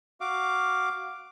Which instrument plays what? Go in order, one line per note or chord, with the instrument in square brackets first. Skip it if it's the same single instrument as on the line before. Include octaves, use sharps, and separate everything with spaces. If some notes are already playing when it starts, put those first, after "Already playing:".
[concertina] F#4 F5 D6